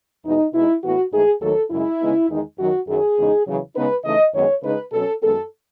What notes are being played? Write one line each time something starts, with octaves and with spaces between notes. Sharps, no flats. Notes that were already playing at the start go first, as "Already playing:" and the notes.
E2 B2 G#3 D#4
B2 G#3 D#4 E4
A2 E3 B3 F#4
G#2 E3 A3 D#4 G#4
D#2 D#3 F#3 A3 A4
F#2 C#3 G#3 E4
C#3 G#3 B3 D#4
E2 D#3 G#3 D#4
F#2 D#3 F#3 F#4
F#2 D#3 F#3 G#4
E2 C#3 G#3 D#4
E2 C#3 F#3
C#3 G#3 B3 D#4 B4
C#3 E3 A3 D#4 D#5
F#2 D#3 G#3 B3 D#4 C#5
C#3 G#3 D#4 B4
B2 F#3 C#4 A4
F#2 D#3 G#3 B3 A4